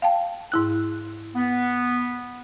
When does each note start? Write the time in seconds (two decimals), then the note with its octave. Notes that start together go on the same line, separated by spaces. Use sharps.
0.02 F5 G5 A5
0.52 G#2 E4 F#6
1.35 B3